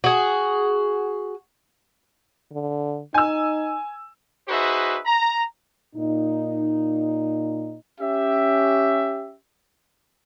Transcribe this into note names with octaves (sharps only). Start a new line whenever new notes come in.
F#4 G#4
D3
D#4 G#5 E6
D#4 F#4 G#4 B4 C5 E5
A#5
A#2 D#4
C#4 G4 E5